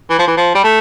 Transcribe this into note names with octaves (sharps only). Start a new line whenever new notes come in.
E3
F3
E3
F3
G3
A3